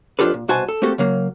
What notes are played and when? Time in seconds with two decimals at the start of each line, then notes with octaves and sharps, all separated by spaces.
0.19 F2 D4 F4 G4 A4 B4
0.34 A#2
0.48 C2 B2 F#4 C5 G#5 A5
0.68 A4
0.82 A3 A#3 C4 F#4 G4 A4
0.98 C#3 F#3 A#3